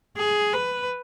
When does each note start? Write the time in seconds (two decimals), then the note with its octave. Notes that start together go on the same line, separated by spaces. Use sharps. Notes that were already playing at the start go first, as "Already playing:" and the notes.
0.17 G#4
0.53 B4